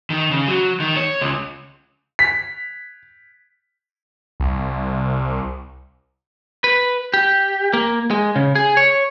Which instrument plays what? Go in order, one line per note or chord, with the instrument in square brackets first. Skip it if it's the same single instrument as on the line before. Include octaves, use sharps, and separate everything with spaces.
[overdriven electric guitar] D#3
C#3
F#3
D#3
C#5
C#2
[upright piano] B6
[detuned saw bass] C2
[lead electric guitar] B4
G4
A#3
G#3
C#3
G#4
C#5